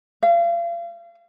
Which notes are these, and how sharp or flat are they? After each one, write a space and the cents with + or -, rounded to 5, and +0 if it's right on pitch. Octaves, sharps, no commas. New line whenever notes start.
F5 -35